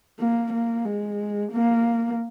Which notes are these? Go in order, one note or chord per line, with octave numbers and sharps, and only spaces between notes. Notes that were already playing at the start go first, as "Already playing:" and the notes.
A#3
A#3
G#3
A#3